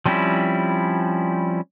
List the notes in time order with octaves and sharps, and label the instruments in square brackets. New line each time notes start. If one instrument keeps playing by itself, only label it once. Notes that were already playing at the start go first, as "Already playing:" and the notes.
[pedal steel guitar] F3 G3 C4 C#4 E4